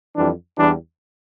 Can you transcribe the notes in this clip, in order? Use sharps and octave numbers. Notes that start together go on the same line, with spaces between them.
F2 E3 G3 D4
E2 E3 G3 D4